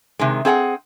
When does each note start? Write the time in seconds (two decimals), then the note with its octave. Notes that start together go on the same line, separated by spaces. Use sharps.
0.19 C3 D#3 G#3
0.45 C4 G#4 F5 F#5